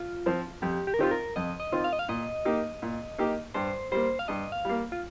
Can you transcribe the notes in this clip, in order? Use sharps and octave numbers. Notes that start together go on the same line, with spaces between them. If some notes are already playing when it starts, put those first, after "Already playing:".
Already playing: F4
F3 C4
F2 G4
G4
A#4
D#3 C4 F4 G4
A#4
F2 D#5
D#5
D#3 C4 F4
F5
D#5
F5
A#2 D#5
A#3 D#4 G4
A#2
A#3 D#4 G4
G2 C5
G3 A#3 C5
F5
G2 D#5
F5
G3 A#3
F4